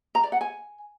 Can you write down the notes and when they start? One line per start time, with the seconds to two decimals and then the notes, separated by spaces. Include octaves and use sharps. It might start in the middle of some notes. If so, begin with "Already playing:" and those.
0.15 A#5
0.24 D5
0.32 F#5
0.41 G#5